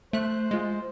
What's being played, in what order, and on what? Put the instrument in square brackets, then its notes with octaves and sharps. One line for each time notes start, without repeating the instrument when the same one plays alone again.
[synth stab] A3 F#6 [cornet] C5
[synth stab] G#3 F4